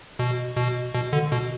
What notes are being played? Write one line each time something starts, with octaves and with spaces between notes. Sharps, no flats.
B2
B2
B2
D3
B2